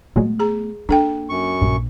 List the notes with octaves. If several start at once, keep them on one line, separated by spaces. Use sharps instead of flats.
A#2 F#3 G#3 A3 B3
G#4 A#5
A#3 D4 A4 G5
F#2 C#6
A#1 G2